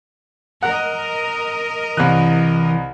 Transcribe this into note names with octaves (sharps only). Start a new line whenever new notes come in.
A#4 D#5 F#5
C2 E3 F#6